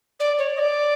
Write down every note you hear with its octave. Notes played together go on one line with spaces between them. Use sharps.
D5
C#5
D#5
D5